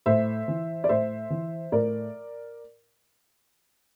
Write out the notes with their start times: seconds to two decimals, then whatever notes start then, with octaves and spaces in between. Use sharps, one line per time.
0.06 A2 C5 E5
0.48 E3
0.84 D5
0.89 A2 C5 E5
1.30 E3
1.72 A2 A#4 D5